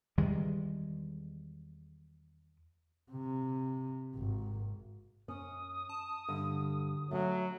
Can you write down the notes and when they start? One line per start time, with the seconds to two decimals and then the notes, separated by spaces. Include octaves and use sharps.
0.18 E2 D#3 G3 G#3
3.12 C3
4.15 G#1
5.28 F#2 C#4 D#6
5.89 A5
6.28 G2 D3
7.11 F#3 A3 C#4